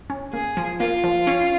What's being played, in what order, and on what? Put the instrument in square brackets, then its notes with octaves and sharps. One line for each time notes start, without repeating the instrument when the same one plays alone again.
[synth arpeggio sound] C#4
[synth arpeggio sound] A#3 [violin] G#4
[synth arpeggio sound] F3
[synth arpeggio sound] A#3 [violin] F4
[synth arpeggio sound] F3
C#4